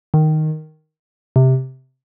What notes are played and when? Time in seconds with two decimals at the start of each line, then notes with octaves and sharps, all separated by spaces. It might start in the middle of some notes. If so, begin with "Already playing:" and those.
0.14 D#3
1.36 C3